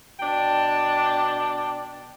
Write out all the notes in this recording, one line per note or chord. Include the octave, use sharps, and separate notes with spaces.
B2 D4 G5 A5